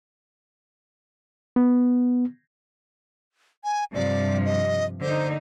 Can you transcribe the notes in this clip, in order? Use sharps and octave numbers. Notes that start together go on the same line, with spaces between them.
B3
G#5
G2 C3 F3 D5
D#5
D3 A#3 D#4 C5